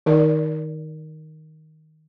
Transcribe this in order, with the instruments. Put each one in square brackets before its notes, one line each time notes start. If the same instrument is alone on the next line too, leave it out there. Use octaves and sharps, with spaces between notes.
[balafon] D#3 D#4 A#4 D5